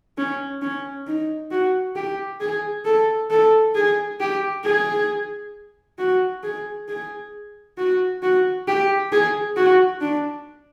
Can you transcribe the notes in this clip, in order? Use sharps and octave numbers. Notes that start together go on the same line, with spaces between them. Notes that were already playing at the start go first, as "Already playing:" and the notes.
C#4
C#4
D#4
F#4
G4
G#4
A4
A4
G#4
G4
G#4
F#4
G#4
G#4
F#4
F#4
G4
G#4
F#4
D4